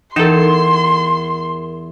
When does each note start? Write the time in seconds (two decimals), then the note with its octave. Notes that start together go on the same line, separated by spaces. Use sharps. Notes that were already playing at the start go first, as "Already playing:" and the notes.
0.16 E2 D#4 A4 A#4 G5 C6 E7